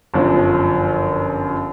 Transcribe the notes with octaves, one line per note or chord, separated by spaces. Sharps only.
G1 F#2 F3